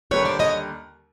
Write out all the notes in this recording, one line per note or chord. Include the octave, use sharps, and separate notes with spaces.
D#2 D3 G3 B4 C#5
C5 D5
C#5 D#5